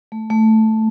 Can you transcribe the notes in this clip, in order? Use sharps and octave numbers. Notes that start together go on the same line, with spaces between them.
A3
A3